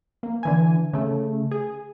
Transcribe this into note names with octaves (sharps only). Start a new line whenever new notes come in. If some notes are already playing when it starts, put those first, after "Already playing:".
A#3
D3 E3 G#5
C#3 A3
G#4